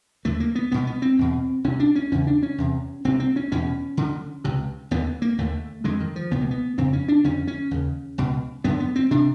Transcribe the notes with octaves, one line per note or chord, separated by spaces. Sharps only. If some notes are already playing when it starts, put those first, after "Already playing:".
D#2 D3 A3
A#3
B3
C2 B2 B3
B3
C4
E2 B2
C2 C3 C#4
D4
C#4
E2 C#3 C#4
D4
C#4
E2 C3
C2 C3 C4
C4
C#4
E2 B2 C#4
D2 D3
C#2 C3
D#2 D3 B3
A#3
D#2 D3 A3
F2 D3 G#3
D#3
F3
C#2 B2 B3
A#3
B3
F2 C#3 C4
C#4
D4
F2 D3 C#4
C#4
D#2 C#3
C#2 B2
F#2 D3 B3
B3
C4
C3 D4